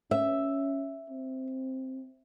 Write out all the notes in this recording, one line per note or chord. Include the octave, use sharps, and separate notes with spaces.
C#4 E5
C4